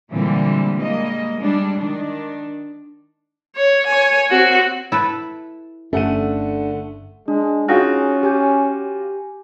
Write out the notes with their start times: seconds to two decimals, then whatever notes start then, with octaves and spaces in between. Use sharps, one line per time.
0.12 A#2 D3 E3 G3 G#3 C4
0.77 G3 G#3 A#3 D#5
1.39 G3 G#3 D4
1.78 D#3 D4
3.56 C#5
3.87 C#5 G#5
4.30 C4 F#4
4.92 E4 A4 B4
5.93 G1 D3 A3 C#4 F#5 D#7
7.28 G#3 D4
7.68 C#4 D#4 F4 F#4 G#4 G5
8.23 G4 G#5 G6